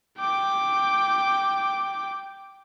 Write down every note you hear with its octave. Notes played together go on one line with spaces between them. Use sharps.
G5 D6